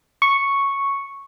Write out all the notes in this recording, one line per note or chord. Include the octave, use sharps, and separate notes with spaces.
C#6